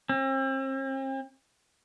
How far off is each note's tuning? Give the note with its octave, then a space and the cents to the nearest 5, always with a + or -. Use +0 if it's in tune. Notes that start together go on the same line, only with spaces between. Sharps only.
C4 +40